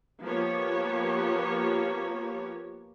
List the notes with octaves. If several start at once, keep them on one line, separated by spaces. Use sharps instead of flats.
F3 A#3 B3 G4 C#5